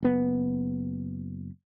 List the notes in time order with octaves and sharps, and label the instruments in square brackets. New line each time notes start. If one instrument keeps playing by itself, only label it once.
[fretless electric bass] F#1 B3